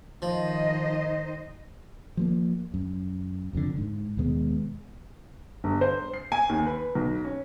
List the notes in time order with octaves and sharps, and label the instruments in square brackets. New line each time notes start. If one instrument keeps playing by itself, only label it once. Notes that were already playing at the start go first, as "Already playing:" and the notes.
[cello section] D#3 C5 D#5 [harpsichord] F3
[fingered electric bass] F3 G3 A#3
F#2
F1 F2 A2 D3
G#2
D#2 B2 G#3 B3
[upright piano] G1
C5
C7
G#5
D#2
B4
B1
C#4